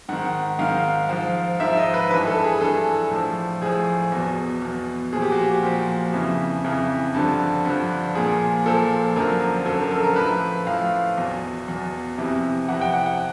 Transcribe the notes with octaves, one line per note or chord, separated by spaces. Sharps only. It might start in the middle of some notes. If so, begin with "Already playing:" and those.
G#2 D#3 F#5
G#2 D#3 F5
G#2 F3 F5
G#2 F3 E5
D#5
B4
G2 E3 B4
A4
G#4
G2 E3 A4
A2 F3
A2 F3 G#4
E2 B2
E2 B2
A#2 F3 G#4
G4
F#4
G4
A#2 F3
F2 C#3 E3
F2 C#3 E3
G2 D3 F3
G2 D3 F3
A#2 F3 G#4
A#2 F3 A4
F#2 D3 F3 A#4
F#2 D3 F3 A4
A#4
A4
A#4
A2 F3 B4
A2 F3 F5
E2 B2
E2 B2
F2 C3 E3
F2 C3 E3 F#5
G5
F#5
F#5